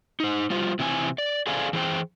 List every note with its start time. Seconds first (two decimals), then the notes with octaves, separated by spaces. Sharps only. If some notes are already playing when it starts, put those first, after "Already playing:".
0.20 D#4 C5
0.50 G3 F4 C5
0.79 C3 E3 C4 G#5
1.18 D5
1.47 G#4 A4 C5 D5 F5 G#5
1.73 E3 G#4 C5 G5